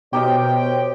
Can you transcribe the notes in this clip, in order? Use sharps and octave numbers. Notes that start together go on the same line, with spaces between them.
B2 G4 A#4 C5 C#5 D#5 G5